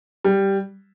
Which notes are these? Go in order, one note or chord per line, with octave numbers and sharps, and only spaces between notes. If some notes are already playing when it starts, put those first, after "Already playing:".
G3